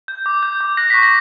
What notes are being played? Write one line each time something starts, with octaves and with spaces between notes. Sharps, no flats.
G6
D6
G6
D6
F#6 A#6
B6
C#6
A#6